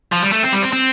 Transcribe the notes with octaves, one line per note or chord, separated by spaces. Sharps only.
F3
G3
A3
C4
G3
C4
C4